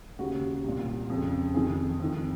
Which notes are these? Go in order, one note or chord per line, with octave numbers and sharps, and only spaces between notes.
D#2 C#3 F#4
C2 A#2
F2 C#3
F2 C3 D#3 G#4
F2 D#3